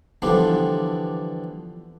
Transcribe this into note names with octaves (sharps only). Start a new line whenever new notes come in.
D3 E3 F3 G3 B3 D4